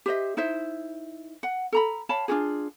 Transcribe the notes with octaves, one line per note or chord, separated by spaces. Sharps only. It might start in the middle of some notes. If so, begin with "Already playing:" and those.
G4 C5 D#5 E5
D#4 E4 C5 E5
F#5
A4 A#5 B5
C#5 F5 A5 B5
D4 F4 F#4 G#4